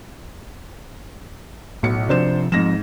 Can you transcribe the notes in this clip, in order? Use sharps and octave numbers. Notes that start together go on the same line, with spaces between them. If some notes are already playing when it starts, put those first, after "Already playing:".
B1 A2 C#7
C3 F3 D4 C5 E7
G#2 F3 C4 A#6 E7